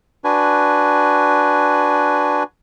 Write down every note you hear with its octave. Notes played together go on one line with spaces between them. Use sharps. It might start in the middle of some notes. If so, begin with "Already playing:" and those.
D4 F#4 B4 G#5